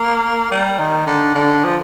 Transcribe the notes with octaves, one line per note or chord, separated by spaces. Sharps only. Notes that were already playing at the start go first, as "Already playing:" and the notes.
Already playing: A#3
G3
D#3
D3
D3
F3